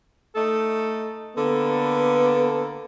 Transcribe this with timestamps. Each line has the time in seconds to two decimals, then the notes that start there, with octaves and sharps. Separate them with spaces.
0.35 A3 D#4 A4
1.37 D3 A#3 B3 A4